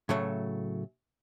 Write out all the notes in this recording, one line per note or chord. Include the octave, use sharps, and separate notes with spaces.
A2 C#3 F#3 A3